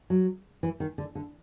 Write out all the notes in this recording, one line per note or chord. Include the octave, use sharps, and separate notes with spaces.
F#3
E3
D#3
D3
D3